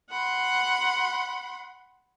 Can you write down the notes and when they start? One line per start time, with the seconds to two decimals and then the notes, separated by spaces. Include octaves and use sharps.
0.11 F#5 B5 C6